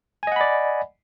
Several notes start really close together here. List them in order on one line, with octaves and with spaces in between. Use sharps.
G#5 D#5 F#5 B5 D5